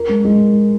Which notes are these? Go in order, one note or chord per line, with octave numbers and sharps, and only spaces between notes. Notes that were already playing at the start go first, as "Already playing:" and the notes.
Already playing: A#4
G#3
G#3